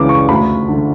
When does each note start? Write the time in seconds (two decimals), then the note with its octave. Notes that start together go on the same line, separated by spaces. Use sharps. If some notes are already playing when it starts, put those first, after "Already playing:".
Already playing: C#2 C#3 E3 D6
0.09 C#6
0.29 D2 B5
0.68 D3